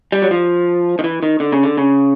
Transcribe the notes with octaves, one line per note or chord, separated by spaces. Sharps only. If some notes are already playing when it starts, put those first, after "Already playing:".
G3
F#3
F3
D#3
E3
D#3
D3
C#3
D3
C#3